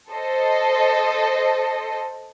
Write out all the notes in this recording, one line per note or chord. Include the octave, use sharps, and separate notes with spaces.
A4 C5 D#5